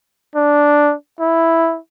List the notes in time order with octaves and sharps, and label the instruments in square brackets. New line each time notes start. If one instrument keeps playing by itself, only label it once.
[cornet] D4
E4